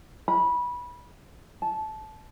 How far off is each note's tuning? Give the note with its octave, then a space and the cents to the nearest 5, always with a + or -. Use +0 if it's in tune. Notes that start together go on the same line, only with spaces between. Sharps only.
B5 -20
A5 -20